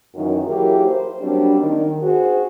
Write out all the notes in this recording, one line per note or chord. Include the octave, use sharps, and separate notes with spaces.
F#2 D#3 E3
F#3 A#3 E4 G4 G#4 A#4
C5
F#3 G3 A#3 C4 D4
D#3
C4 F#4 G#4 C5